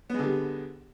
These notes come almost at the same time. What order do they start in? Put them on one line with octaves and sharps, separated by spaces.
B3 G#3 D3 G3